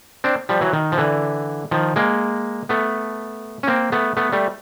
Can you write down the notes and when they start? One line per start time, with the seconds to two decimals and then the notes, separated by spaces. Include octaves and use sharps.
0.24 C4 D4
0.49 F3 G3
0.61 E3 F#3
0.73 D#3
0.92 F3
0.98 D3 E3
1.71 D#3 F3
1.96 G#3 A#3
2.69 A3 B3
3.63 C#4
3.67 A#3 C4
3.92 A3 B3
4.17 A3 B3
4.32 G3 A3